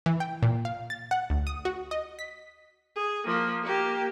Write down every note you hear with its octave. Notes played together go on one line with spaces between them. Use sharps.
E3
G5
A#2
F5
A6
F#5
D2
D#6
F#4
D#5
B6
G#4
F3 A#3
A#3 G4